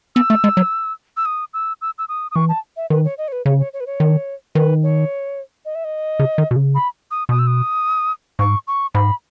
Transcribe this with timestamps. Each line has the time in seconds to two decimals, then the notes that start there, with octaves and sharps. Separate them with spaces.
0.15 B3 E6
0.30 A3
0.44 G#3
0.57 F#3
1.17 E6
1.25 D#6
1.53 E6
1.81 E6
1.98 E6
2.08 D#6
2.31 D#6
2.35 E3 C#6
2.49 A5
2.76 E5
2.90 D#3 B4
3.04 C#5
3.18 D#5
3.28 C#5
3.32 B4
3.45 C#3 C#5
3.59 C#5
3.73 C#5
3.80 B4
3.86 C#5
4.00 D#3
4.55 D#3 B4
4.83 C#5
5.65 D#5
5.75 E5
5.84 D#5
6.19 C#3
6.38 D#3
6.51 B2
6.56 C#3
6.75 B5
7.11 D#6
7.29 B2 D#6
7.39 E6
7.47 D#6
8.39 G#2 C#6
8.67 C#6
8.95 G#2 B5